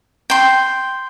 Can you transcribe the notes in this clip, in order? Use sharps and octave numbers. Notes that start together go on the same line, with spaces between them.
G5 C6